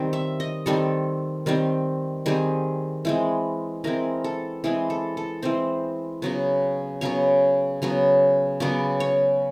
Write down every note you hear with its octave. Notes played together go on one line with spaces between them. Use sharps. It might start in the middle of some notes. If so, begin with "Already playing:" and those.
Already playing: D#3 G3 C4
E5
D#5
D#3 G3 C4 A4
D#3 G3 C4
D#3 G3 C4 G#4
E3 G#3 C4
E3 G#3 C4 A#4
A4
E3 G#3 C4 G#4
A4
A4
E3 G#3 C4 C5
C#3 F#3 B3
C#3 F#3 B3 C#5
C#3 F#3 B3
C#3 F#3 B3 D5
C#5